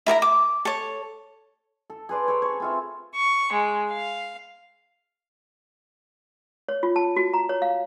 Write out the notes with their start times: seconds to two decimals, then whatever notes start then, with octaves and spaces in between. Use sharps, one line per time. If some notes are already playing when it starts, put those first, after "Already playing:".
0.06 E4 A#4 F5 A#5
0.22 D6
0.65 A4 C#5
1.90 A4
2.09 G#4 B4 C5 D5
2.28 G#4 A4 C#5
2.42 C#5 C#6
2.60 C4 F4 E5
3.16 C#6
3.52 G#3
3.92 F5
6.69 C#5
6.83 F4
6.96 A5
7.17 F#4
7.34 A#5
7.49 C#5
7.62 F5